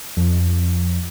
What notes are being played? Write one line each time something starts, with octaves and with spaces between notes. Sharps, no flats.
F2